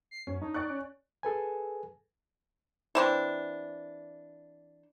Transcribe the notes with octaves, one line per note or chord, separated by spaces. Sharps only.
C7
F#2 C#4
D4 D#4
D5 C#6 F#6
C#4
G#4 A4 B4 G#5
E3 C4 D4